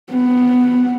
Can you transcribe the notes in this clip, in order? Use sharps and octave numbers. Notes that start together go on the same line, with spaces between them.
B3